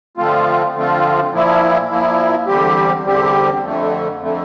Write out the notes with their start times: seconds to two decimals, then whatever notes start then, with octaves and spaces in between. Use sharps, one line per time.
0.17 D3 F3 A3 C4 F4
0.75 D3 F3 A3 C4 F4
1.32 A#2 F3 A#3 E4
1.89 A#2 F3 A#3 E4
2.47 E2 D3 G3 C4 G4
3.05 E2 D3 G3 C4 G4
3.62 F2 D3 A3
4.19 F2 D3 A3